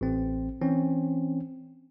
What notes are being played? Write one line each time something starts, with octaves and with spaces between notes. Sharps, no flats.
A1 C4
E3 C4 C#4